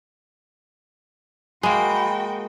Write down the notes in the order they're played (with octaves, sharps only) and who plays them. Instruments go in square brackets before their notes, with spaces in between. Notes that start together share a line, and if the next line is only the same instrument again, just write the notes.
[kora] G#3 A#3 [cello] F#4 G5 [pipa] G#5 [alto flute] B5